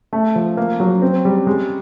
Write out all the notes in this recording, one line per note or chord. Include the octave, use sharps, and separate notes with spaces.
A3
F3
A#3
F#3
C4
G3
G#3